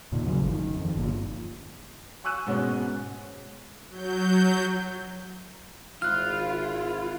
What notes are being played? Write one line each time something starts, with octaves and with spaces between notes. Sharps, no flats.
D#2 A#2 D#3
C#3 F#3
G#1 F3
D#3
F2
G1 A#2
G#5 C#6 E6 F#6 D#7 E7
G#2 B2 G#3 B3 C#4
F#3 G6
G#1 E4 F4 F6 F#6